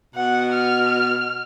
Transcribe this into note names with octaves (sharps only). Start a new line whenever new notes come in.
B2 F#5
F6